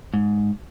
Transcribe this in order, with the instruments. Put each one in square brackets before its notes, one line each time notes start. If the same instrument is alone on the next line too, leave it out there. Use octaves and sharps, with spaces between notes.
[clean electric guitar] G#2